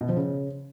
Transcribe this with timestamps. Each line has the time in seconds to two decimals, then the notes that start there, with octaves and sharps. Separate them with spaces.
0.01 B2
0.09 F3
0.17 C#3